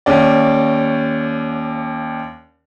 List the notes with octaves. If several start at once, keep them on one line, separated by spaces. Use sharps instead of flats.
D#2 C#4 D5